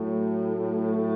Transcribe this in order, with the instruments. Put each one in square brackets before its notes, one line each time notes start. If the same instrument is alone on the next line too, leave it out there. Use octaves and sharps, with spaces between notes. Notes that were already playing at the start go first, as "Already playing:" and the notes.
Already playing: [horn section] A2 F#3 A3